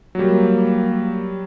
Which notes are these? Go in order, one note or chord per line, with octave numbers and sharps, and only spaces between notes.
F#3 G3 A#3